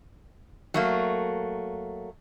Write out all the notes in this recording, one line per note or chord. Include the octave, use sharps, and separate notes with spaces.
F#3 A3 A#3